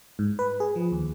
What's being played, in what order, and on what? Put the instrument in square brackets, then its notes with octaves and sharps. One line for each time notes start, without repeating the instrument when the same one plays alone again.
[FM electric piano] G#2
B4
G#4
F3
D#2